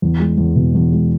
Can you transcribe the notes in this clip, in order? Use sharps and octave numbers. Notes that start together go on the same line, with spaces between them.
E2
G#3
E2
B2
E2
G#3